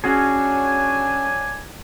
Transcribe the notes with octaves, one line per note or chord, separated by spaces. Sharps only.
F#3 C#4 D4 F#4 G#4 G#5